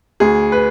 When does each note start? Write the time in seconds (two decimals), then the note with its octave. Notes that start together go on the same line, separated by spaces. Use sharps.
0.20 D2 G#4
0.52 B4